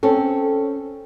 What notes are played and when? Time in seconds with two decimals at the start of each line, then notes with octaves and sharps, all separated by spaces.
0.03 C4 C#4 A4